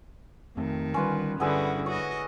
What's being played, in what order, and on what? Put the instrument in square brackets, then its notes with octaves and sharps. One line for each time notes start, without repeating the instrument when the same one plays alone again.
[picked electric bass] F2 A3 C4 [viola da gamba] D#3
[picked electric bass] D3 G3 [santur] C#4 F4 B4
[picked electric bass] G2 [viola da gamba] D3 C#4 F#4 [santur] B3 E4 G#4
[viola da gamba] F#4 D#5 [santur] C#5